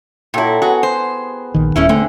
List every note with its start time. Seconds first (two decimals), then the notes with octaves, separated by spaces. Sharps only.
0.34 A#2 F#3 E4 A4 G5
0.62 B3 F#4 G#4
0.83 C5
1.54 A#1 D#3
1.76 D#1 A3 C#4 E4
1.89 D3 A3 C4 G#5